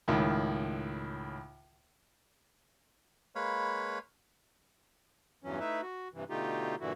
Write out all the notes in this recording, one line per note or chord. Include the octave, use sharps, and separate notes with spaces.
C#2 A2 D#3
G#3 A#3 B4 C#5 F5 B5
E2 G2 E3 F#3 C#4
A3 D#4 E4 B4 E5
F#4
G2 C3 E3
B2 D3 A3 D#4 F4 G4
G2 A#2 D3 E3 E4 F#4